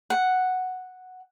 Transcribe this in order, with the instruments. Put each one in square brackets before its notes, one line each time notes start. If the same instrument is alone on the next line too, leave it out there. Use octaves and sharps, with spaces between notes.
[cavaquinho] F#5